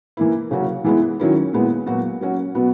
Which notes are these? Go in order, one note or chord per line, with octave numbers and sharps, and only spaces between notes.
E3 A#3 E4
C#3 F#3 C#4 F#4
E3 G#3 B3 E4
D#3 F#3 C#4 E4
A#2 G#3 B3 E4
A#2 F#3 B3 F#4
F#3 C#4 F#4
B2 F#3 B3